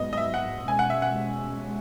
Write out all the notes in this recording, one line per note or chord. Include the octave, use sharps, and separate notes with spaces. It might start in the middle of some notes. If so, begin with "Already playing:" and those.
Already playing: G#2 F#3 B3 D#5
D#5
E5
F#5
B2 G#3 C#4 G#5
F#5
E5
F#5